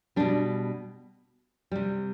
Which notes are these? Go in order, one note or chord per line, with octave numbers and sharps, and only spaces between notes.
B2 G3 D4
C3 G3